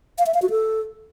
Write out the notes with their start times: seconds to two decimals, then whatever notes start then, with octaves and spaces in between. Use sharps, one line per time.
0.18 F5
0.26 E5
0.34 F5
0.42 F#4
0.50 A4